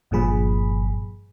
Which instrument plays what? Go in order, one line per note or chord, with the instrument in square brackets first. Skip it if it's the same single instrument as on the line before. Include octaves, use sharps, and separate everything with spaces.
[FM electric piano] G1 G2 A#2 F3 G#4 B5